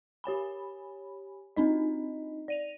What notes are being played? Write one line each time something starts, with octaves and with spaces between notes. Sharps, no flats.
G4 C#5 G#5 B5
C4 D4 D#4 D#5
D5 D#7 F7